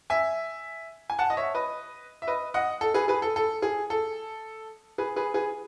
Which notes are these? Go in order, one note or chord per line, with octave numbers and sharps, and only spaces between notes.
E5 G#5
G#5
F#5 A5
D#5
C#5 E5
B4 D#5
E5
B4 D#5
D#5 F#5
A4
G#4 B4
G#4 B4
A4
A4
G#4
A4
G#4 B4
G#4 B4
G#4 B4